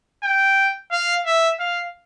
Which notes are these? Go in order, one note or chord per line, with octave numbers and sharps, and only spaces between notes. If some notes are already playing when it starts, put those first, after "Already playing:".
G5
F5
E5
F5